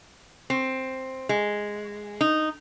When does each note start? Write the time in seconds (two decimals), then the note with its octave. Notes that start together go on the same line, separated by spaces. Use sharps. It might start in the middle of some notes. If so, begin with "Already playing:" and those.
0.50 C4
1.29 G#3
2.21 D#4